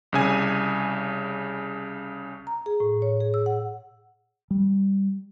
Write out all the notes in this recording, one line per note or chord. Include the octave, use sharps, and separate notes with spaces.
C2 C#3 G#5
A#5
G#4
A2
C#5
G#4
E6
F#5
G3